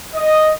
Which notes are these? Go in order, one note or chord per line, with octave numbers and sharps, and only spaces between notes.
D#5